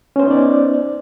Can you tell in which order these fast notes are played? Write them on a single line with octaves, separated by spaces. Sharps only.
C#4 C5 B3 D#4 D5